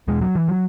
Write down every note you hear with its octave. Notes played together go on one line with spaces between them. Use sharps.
E2 B2 G#3
F#3
E3
F#3